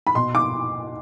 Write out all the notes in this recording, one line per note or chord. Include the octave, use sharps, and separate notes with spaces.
B5
B2 C6
D6